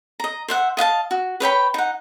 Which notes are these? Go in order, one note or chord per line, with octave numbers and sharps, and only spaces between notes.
D#5 A#5
C5 E5 F#5
D#5 F5 F#5 A5
F#4
B4 C#5 G5 B5
D#4 F#5